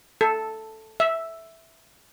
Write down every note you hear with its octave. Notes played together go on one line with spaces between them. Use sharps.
A4
E5